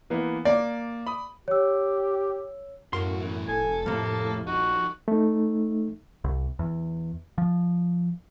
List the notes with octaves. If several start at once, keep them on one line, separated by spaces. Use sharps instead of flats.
E3 A#3 B3
A#3 D5
B5 D#6
G4 C#5 E6
F#2 A2 E4 F#4 A#4 C6
B2 E3
F1 A4 G#5
F2 A2 C3 A#3
A#1 F3 D#4 F#4
A3 D#4
C2
E2
F3